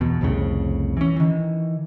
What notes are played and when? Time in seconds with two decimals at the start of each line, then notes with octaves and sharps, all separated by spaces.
0.01 E2 B2
0.21 C2 F2 A2 C#3
0.97 E3 C#4
1.16 D#3 E3